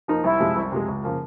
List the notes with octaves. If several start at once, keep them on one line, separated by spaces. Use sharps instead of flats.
F3 A#3 D#4
C2 E4
C3 F3 G#3
C2
C3 F3 G#3
C#2
C#3 F3 A#3